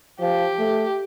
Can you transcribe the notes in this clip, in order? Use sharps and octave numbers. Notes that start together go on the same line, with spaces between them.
F3 G4
A3